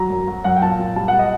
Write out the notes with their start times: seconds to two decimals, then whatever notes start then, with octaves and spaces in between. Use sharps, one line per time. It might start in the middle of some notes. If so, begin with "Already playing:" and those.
Already playing: F#3 A#5
0.10 F#2
0.27 F#3
0.44 F#2 F#5
0.56 G5
0.62 A#2 A5
0.79 A#2
0.96 G3 A5
1.08 G3 F#5
1.19 D#5